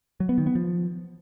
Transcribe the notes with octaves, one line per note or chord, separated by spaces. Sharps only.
F#3
B3
D#3
B3
F3